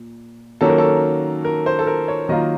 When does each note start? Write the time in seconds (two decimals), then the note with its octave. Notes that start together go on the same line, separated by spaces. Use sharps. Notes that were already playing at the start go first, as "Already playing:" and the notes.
Already playing: A#2
0.61 D#3 F#3 A#3 C#4 A4
0.70 A#4
0.78 A4
1.45 A#4
1.66 C5
1.79 A4
1.87 A#4
2.08 C#5
2.29 D#3 F#3 A#3 F4 D#5